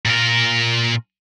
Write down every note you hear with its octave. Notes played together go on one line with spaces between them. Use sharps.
A#2 A#4